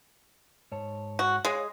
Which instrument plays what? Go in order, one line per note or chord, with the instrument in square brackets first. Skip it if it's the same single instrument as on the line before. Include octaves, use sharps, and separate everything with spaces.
[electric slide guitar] G#2 C#5 A5
[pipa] F#4
[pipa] G#3 [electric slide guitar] C#5 F5